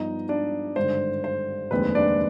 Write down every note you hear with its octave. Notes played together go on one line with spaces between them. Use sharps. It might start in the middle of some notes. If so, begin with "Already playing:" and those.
Already playing: G2 F3 B3 D#4 D#5
D4 D5
G#1 G2 D3 C5
C5
F1 D#2 D3 G#3 C4 B4
D4 D5